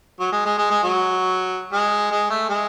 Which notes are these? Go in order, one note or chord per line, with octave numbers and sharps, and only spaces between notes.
F#3
G#3
G#3
G#3
G#3
F#3
G#3
G#3
A3
G#3